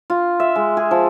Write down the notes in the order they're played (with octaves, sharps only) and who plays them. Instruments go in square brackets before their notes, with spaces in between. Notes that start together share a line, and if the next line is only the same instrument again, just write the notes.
[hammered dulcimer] F4
E5
G#3
G#4
F3